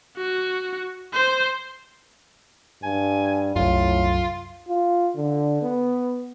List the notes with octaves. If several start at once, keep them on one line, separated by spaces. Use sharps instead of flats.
F#4
C5
G2 G#5
C2 F#2 A2 F4
F4
D3
B3